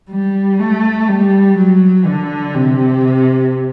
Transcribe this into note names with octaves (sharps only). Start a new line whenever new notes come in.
G3
A3
G3
F#3
D3
C3